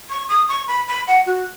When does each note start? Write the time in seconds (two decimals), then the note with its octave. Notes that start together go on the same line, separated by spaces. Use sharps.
0.10 C#6
0.29 D#6
0.49 C#6
0.68 B5
0.88 B5
1.07 F#5
1.26 F#4